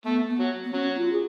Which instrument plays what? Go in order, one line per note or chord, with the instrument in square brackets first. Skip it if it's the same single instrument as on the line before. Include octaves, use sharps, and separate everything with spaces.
[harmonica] A3 [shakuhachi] B3
[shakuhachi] B3
[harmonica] F#3
[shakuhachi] B3
[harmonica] F#3 [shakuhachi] C#4
[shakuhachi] F4
G#4